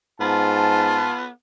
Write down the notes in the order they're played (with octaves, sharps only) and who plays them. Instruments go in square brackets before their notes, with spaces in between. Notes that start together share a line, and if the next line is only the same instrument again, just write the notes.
[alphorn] G#2 [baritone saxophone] B3 [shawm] F4 [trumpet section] A5